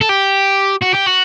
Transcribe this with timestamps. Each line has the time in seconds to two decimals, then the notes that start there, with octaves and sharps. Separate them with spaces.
0.01 A4
0.09 G4
0.82 F#4
0.94 G4
1.07 F#4